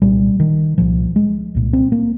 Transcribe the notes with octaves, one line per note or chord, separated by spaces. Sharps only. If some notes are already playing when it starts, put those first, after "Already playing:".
C2 A#2 G3
D#3
C2 A#2 F3
G#3
C2 A#2
C4
A#3